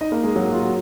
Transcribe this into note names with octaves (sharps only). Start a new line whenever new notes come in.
D#4 D#5
A#3 A#4
G#3 G#4
F#3 F#4
F4
F#4